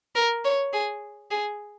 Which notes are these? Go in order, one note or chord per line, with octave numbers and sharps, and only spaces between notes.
A#4
C#5
G#4
G#4